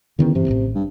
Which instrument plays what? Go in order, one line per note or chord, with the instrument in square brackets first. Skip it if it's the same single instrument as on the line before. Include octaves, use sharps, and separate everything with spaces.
[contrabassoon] E2 [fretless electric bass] D3 D#3 C#4
[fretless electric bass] G2 E3 [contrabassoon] C3
[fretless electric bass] D#1 A1 A2
[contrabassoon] G2